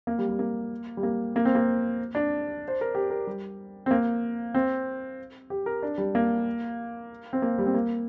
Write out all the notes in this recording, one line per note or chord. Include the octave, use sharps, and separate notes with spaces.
A#3
G3
G3
A#3
G3
A#3
A#3
C4
A#3
D4
C5
A#4
G4
A#4
G3
C4
A#3
C4
G4
A#4
D4
G3
A#3
C4
A#3
G3
C4
A#3